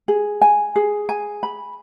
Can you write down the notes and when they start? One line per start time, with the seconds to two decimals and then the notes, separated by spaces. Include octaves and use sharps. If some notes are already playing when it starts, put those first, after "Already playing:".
0.08 G#4
0.41 G#5
0.76 G#4
1.09 G#5
1.43 B5